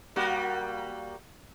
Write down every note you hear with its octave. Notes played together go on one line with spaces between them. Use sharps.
G3 A#3 F#4